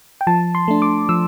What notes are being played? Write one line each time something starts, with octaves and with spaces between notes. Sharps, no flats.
G5
F3 A5
C6
A3 D4
D6
F3 E6